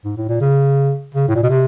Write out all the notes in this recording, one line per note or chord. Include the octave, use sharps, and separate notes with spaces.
G#2
A2
A#2
C#3
C#3
A2
A#2
B2
C3